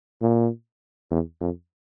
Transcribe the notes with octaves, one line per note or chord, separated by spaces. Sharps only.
A#2
E2
F2